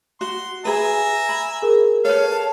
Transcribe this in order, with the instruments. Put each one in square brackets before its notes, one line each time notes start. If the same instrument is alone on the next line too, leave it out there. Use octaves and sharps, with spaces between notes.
[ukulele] F#4 [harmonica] C6
[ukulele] G#4 B4 [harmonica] E5 G#5 A#5
[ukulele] B5
[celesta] G#4 A#4
[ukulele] A4 B4 [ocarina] C#5 [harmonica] F5
[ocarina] A5